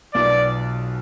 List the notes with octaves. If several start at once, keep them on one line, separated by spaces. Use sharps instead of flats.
B1 B2 B3 F4 D5